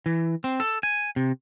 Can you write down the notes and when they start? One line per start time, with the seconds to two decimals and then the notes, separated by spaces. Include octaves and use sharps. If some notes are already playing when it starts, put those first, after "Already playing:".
0.06 E3
0.44 C4
0.60 A4
0.83 G#5
1.16 C3